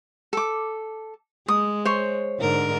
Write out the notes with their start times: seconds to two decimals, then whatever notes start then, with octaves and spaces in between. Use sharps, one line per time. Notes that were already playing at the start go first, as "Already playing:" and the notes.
0.33 A4 D6
1.48 G#3 D#6
1.85 C5 C#5
2.40 G#2 D3 A#4